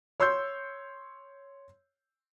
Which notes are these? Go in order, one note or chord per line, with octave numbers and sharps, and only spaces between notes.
C#5 C6 E6 G6